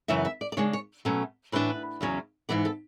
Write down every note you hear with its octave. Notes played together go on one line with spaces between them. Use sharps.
F#2 C#3 E3 B3 E5
E5
D5
D5
C#3 G#3 D4 C#5
C#5
B2 F#3 A3 C#4
A2 E3 B3 D4 B4
E2 C#3 F#3 C#4
G#2 E3 B3 D5
A4